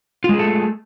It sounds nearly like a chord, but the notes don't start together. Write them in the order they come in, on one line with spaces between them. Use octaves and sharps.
F4 G#3 G#4 A4 A3